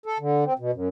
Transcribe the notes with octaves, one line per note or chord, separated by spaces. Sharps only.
A4
D3
C4
B2
F#2